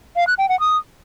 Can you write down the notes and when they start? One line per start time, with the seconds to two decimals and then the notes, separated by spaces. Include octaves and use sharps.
0.16 F5
0.27 F#6
0.38 G5
0.49 F#5
0.60 D#6